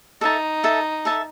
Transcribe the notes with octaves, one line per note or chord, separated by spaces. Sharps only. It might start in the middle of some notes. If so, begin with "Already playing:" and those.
D#4 A4 E5 A5
A4 E5 A5
A4 E5 A5